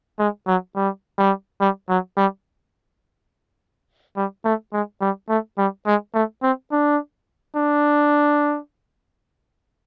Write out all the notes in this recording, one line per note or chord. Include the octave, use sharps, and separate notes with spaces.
G#3
F#3
G3
G3
G3
F#3
G3
G3
A3
G#3
G3
A3
G3
G#3
A3
C4
D4
D4